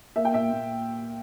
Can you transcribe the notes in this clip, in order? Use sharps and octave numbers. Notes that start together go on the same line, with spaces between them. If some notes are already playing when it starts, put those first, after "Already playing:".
A#3 E5
G5
A#2 E5
A#2